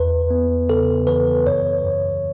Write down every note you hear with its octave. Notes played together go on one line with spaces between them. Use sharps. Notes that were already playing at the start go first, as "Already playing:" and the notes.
Already playing: E2 B4
B3
C#3 A4
E3 B4
F#2 C#5
F#2